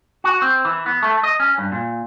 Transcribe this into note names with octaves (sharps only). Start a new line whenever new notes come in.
F#4
C4
E3
B3
A3
D#5
C#4
G2
A#2